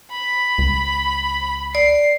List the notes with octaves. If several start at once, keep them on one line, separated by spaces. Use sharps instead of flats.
B5
C#2
D5 C7